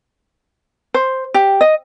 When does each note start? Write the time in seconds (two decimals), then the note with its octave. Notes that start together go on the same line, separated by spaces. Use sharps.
0.94 C5
1.34 G4
1.61 D#5